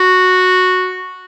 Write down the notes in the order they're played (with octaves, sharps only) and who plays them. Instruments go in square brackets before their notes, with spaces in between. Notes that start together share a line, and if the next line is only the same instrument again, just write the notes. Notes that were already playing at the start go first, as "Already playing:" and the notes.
Already playing: [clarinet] F#4